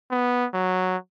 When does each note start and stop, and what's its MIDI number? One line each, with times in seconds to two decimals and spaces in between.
0.11 0.46 59
0.54 0.97 54